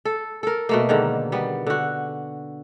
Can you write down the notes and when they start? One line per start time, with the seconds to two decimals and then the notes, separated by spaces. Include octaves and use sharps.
0.05 A4
0.43 A4 A#4
0.69 B2 A3 A#3
0.89 G#2 D3 D#3
1.32 G3 B3
1.67 D3 F#4